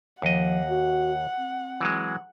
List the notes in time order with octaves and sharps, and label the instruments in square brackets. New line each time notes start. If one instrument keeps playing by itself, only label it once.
[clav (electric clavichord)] D#2 D#5 [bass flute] F3 [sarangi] F#5
[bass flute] F#4
C4
[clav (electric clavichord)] E3 F#3 G#3